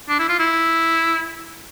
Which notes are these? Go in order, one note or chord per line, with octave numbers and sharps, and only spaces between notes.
D4
E4
F4
E4